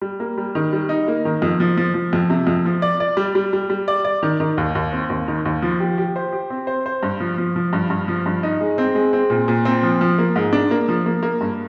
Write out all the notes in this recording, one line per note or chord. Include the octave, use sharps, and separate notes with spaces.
G3
A#3
G3
D#3
G3
D#4
A#3
D#3
F2
F3
F3
F3
F2
C3
F2
F3
D5
D5
G3
G3
G3
G3
D5
D5
D#3
D#3
D#2
D#2
C4
D#2
D#3
D#2
F3
G4
G4
C5
G4
C4
C5
C5
G2
F3
F3
F3
G2
G2
F3
G2
D#4
G#3
C4
G#3
C4
A#2
A#2
C4
F3
F3
A#3
G#2
D4
A#3
F3
A#3
A#3
G2